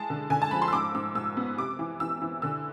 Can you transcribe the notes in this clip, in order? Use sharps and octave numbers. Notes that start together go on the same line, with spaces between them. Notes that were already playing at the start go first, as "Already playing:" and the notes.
Already playing: E3 G#3 A5
D3
D3 G#5
A5
F3 B5
C6
E6
G#2 D6
G#2 E6
G#2 E6
B3
C3 D6
E3
E3 E6
E3
D3 E6